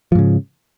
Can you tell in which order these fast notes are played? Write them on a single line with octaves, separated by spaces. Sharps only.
F3 G#2 C#3